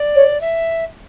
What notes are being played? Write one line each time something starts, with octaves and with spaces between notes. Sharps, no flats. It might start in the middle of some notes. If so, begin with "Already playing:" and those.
Already playing: D5
C#5
E5